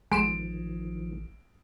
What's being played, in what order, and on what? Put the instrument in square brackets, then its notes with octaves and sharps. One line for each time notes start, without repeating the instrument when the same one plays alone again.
[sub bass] A1 [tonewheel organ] D#3 F3 [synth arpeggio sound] G#3 C6 E7 [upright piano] D7